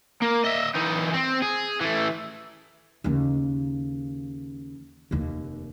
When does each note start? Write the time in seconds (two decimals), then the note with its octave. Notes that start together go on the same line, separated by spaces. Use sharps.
0.22 A#3
0.45 D#5 E5
0.75 E3 D#4
1.14 C4
1.42 G#4
1.81 E3 A3
3.04 D#2 C#3
5.11 F1 D#2